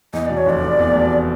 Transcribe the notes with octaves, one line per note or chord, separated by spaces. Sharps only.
E2 D#5
B2 D5
C#5
F1 D5
F1
E2
B2